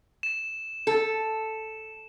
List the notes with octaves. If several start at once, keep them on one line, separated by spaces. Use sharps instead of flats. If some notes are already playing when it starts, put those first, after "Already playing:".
E7
A4